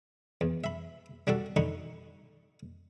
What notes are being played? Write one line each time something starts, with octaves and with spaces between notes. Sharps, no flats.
E2
E5 B5
G3 D4 F#4 A4
D3 D#4 B5 C#6